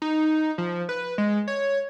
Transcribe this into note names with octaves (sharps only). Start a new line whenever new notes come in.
D#4
F3
B4
G#3
C#5